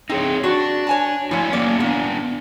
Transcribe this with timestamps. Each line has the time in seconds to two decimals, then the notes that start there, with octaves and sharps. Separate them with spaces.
0.10 C4 D#4 G#4 C#5
0.44 D4 F#4
0.87 C#5 G#5 A5
1.31 F3 A3 E4 C#5 G#5
1.53 F#3 A#3 C#4 D5
1.80 A#2 B3 D4